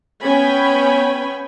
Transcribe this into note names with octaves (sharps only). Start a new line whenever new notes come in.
B3 C#4 G5 G#5 B5